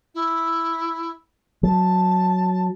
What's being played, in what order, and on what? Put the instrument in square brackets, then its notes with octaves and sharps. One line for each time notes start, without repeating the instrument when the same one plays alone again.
[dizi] E4
[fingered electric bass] F#3 [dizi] A5